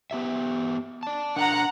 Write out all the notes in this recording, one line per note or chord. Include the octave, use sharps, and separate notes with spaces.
B3 G4 E5
D5 A5
D4 A#4 F#5 A#5